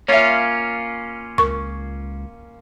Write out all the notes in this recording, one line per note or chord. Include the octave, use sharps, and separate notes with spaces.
A#3 C#4 F4 C#5 E5
C#2 A#4 C#6